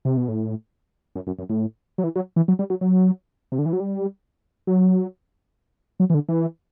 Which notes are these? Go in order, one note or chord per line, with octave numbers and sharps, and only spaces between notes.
C3
B2
A2
F#2
F#2
F#2
A2
F#3
E3
F#3
E3
F#3
G3
F#3
F#3
C3
D3
E3
F#3
G3
F#3
F#3
E3
D3
E3